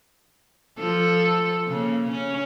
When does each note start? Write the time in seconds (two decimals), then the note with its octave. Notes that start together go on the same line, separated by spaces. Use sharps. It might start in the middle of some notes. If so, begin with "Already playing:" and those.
0.78 F3 A4
1.69 C#3 A#3
2.11 C#4